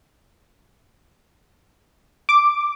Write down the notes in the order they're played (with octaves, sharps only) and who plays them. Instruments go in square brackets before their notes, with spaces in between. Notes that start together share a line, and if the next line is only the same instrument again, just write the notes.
[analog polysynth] D6